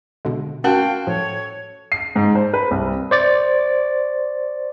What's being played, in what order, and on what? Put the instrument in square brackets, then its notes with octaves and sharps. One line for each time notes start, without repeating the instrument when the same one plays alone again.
[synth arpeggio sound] B2 D3 G#3
[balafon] C#4 A#4 A5 [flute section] F4 G5 [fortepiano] F#4
[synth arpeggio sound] A2 F3 [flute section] A4 C#5
[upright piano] C7
G#2
C5
B4
C2
[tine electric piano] C5 D5 A6